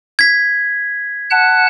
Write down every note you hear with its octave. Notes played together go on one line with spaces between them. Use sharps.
G#6 B6
F#5 A5 F#6